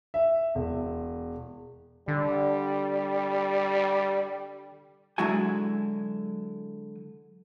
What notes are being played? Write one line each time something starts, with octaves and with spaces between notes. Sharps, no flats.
E5
E1
D3 G3
D3 F#3 G#3 E4 F#4 G#5